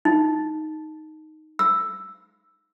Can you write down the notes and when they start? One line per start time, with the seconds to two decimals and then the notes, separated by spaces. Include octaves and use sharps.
0.05 D#4
1.59 E6